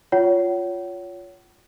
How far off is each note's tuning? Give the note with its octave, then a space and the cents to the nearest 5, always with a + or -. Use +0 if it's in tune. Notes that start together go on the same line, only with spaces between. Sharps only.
F4 +0 C#5 +20 F#5 +40